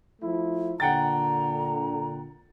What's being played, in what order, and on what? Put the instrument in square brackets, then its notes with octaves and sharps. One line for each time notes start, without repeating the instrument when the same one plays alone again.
[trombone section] F3 A3 E4
[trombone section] A#2 D3 [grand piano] F#5 G5 A6 [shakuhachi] A#5